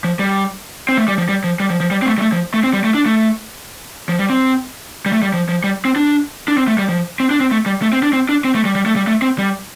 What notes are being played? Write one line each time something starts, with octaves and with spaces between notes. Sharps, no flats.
F3
G3
C4
A3
G3
F3
G3
F3
G3
F3
F3
G3
C4
A3
G3
A3
F3
A3
C4
G3
A3
D4
A3
F3
G3
C4
G3
A3
G3
F3
F3
G3
C4
D4
D4
C4
A3
G3
F3
C4
D4
C4
A3
G3
A3
C4
D4
C4
D4
C4
A3
G3
G3
A3
G3
A3
C4
G3